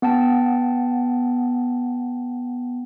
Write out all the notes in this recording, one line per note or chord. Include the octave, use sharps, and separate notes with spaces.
B3 F#5 G5 A5